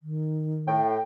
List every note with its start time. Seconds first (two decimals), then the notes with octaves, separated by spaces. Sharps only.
0.03 D#3
0.68 A2 G5